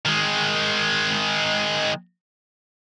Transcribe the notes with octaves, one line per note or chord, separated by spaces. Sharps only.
D#3 G#3